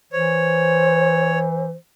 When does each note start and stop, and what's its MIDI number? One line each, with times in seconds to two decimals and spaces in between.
0.12 1.75 52
0.12 1.71 72
0.12 1.39 73